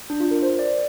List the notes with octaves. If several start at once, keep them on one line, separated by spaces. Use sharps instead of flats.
D4
F4
A#4
C5
D5